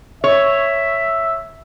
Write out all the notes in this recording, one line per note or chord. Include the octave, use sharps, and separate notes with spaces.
C#5 E5